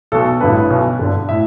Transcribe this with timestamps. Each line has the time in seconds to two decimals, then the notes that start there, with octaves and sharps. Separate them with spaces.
0.12 B1 B2 A4
0.41 A1 G2 D3 B4
0.70 B1 B2
0.99 G1 G2 D3
1.29 A2 E5